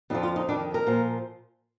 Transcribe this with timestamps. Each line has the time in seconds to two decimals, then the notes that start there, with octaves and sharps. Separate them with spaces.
0.10 F2 D3 F3 D#4
0.23 F4
0.36 D#4
0.49 F2 D#3 D4
0.74 A#4
0.86 A#2 F3